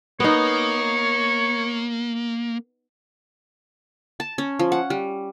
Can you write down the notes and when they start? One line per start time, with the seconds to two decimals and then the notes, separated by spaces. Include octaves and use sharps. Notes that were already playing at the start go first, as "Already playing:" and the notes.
0.20 A#3 B3 D#4 C#5
4.20 A5
4.38 C#4
4.59 F3
4.72 F#5
4.90 G3